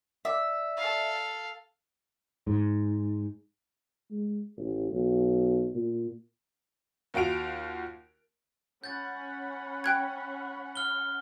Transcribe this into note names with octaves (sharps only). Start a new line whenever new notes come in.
D5 E5
A4 F5
G#2
G#3
A1
B1
A#2
D#2 F4 F#4 D7 F7
C#4 F#5 B5 G6 A6
G5 F#6 G#6
F6 G7